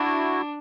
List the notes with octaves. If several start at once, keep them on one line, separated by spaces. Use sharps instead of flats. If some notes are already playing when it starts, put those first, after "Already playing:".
Already playing: D4 E4 F#4